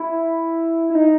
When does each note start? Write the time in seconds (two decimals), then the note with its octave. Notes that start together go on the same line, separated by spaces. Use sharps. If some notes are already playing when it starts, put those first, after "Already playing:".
Already playing: E4
0.90 E4
0.95 D#4